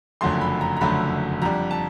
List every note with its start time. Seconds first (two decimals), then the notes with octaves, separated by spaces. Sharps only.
0.21 F#1 F2 D3 F#3 A3 C6
0.41 B5
0.61 A#5
0.77 A#5
0.81 F#1 F2 D3 F#3 A3 B5
1.42 F2 D3 G3 A#5
1.71 A5